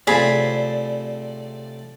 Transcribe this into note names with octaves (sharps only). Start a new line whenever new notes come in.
A2 C3 F3 G#4 D5 B5